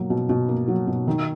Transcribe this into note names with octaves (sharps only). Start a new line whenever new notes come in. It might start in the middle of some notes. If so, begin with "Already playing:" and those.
Already playing: B2 F#3 A#3
B2
B2
A#3
F#3
B2
D#3